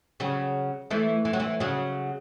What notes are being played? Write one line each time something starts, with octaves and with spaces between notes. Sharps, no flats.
C#3 F#3
E3 A3
E3
F#3
E3
C#3 F#3